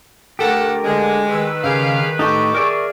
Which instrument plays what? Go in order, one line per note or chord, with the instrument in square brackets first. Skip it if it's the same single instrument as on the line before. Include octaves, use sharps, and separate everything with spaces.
[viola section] D3 A3 [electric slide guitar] G4 [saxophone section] A4 F#5 [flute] A#4
[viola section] D3 [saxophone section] G#3
[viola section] D#3 B4 [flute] E6
[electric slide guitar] C#3 [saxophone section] G3 G4 F5 [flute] G#4
[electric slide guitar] A2 D#4 [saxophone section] G4 A4 [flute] C#6
[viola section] G#4 [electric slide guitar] A#4 D5 E5